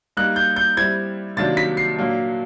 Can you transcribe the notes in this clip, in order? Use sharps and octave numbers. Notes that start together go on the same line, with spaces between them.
G3 A#3 D#4 F#6
G6
G6
G3 C4 E4 G#6
C3 D#3 F#3 A#3 D4 A6
B6
C7
A#2 F#3 A#3 D4